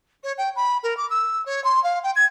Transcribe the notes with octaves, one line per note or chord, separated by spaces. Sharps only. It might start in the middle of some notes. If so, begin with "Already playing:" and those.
C#5
G5
B5
A#4
D6
E6
C#5
C6
F5
G5
G#6